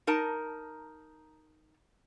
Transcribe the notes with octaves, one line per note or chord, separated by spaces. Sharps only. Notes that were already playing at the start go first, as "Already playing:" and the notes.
D#4 A#4 A5